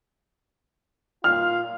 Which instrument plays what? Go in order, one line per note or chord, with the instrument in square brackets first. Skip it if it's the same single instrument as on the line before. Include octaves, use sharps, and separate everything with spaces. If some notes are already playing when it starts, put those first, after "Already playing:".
[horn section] A#2 F4 F5 [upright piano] F6